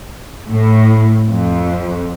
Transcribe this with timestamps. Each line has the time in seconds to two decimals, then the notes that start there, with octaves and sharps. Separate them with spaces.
0.51 A2
1.29 F2